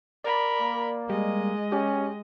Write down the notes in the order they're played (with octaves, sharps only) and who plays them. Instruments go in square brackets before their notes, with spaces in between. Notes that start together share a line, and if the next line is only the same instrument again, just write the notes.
[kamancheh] A#4 B5 [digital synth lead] D5
[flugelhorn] A#3
[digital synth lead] G3 [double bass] G#3 [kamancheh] D#5
[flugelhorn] C#4 [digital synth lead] G4